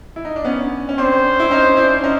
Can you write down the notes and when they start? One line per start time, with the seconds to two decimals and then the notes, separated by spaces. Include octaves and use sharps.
0.16 E4
0.25 D#4
0.36 D4
0.45 B3 C#4
0.89 C#4
0.98 C4 D4 C5
1.40 E4
1.51 C#4 D#4
1.77 D4 E4
2.04 C#4 D#4